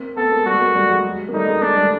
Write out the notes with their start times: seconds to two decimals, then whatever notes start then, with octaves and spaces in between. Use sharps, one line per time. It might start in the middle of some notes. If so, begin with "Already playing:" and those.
Already playing: A#3 C4
0.17 A3 B3 A4
0.32 G#3 A#3
0.46 G3 A3 F#4
0.60 G#3 A#3
0.75 G3 A3
0.90 F#3 G#3
1.29 A#3
1.33 G3 A3 D#4
1.48 G#3 A#3
1.62 G#3 A#3 D4
1.77 G3 A3